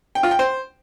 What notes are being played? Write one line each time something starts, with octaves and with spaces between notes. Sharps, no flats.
G5
F4
G5
C5